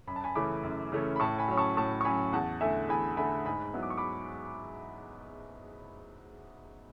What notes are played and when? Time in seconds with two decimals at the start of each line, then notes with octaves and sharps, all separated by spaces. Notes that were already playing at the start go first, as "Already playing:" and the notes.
0.07 F#2 B5
0.16 A5
0.24 G#5 B5
0.35 C#3 E3 A3 C#4 B5 D6
0.63 F#2
0.92 C#3 E3 A3 C#4
1.16 B5
1.20 A2 A5 C#6
1.39 G#5 B5
1.48 F#3 C#4
1.57 A5 C#6
1.77 A2 A5 C#6
2.01 C#6
2.04 F#3 C#4 G#5 B5
2.33 E2 F#5 A5
2.61 D3 A3 E4 E5 G#5
2.89 E2 G#5 B5
3.17 D3 A3 E4 G#5 B5
3.46 G#2 G#5 B5
3.74 F#3 B3 E4
3.83 D6
3.90 C#6
3.98 B5 D6